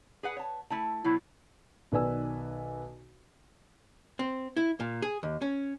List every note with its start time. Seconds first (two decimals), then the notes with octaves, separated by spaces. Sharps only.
0.23 G#4 B4 F#5
0.37 C#5 A5
0.70 A3 E4 A5
1.04 B2 F#3 E4
1.92 B1 D#3 B4 D5 G#5 E6
4.19 C4
4.57 E4
4.80 A#2
5.02 G#4
5.23 D#2
5.42 C#4